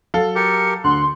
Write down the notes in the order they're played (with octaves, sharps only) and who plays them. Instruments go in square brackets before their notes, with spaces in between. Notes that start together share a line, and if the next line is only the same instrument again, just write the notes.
[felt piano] F#3 [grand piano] A4 F5
[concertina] G4 A#4 [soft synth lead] C#7
[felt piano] D2 D3 [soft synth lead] C6 [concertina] F#6